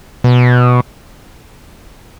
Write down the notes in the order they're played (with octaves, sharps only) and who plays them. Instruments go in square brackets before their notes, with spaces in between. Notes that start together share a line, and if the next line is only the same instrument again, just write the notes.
[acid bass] B2